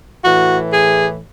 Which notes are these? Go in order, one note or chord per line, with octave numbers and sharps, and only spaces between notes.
A2 E3 F#4
G#4